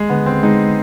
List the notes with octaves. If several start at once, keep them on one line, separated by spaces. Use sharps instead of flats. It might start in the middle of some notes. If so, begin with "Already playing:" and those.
Already playing: D#2 G#3
D3 B3
D#2 C4
G#3 D#4